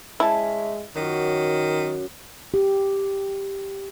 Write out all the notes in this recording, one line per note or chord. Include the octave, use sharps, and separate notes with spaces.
G#3 C#4 E4 E5 A5
F#2 D#3
G4